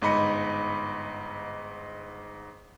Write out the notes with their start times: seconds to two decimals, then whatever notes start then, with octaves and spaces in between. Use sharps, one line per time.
0.02 G1 G#2 D#5 B5 C#7